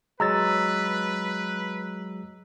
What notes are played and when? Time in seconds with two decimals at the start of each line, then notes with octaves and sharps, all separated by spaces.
0.20 F#3 G#3 B4 A#5 E6 A6